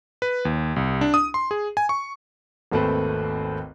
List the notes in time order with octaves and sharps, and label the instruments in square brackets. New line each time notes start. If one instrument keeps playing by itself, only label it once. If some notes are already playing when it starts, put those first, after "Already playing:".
[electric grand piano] B4
D#2
C2
D4
D#6
C6
G#4
G#5
C#6
[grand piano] G#1 D#2 A3 C4 B4 C5